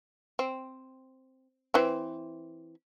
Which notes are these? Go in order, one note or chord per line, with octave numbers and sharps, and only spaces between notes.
C4
E3 C4